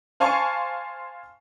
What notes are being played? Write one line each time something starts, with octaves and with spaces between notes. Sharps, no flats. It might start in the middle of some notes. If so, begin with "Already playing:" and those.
C5 F5 G#5 A5 C#6